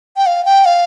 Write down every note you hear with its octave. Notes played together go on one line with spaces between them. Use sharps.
G5
F5
G5
F5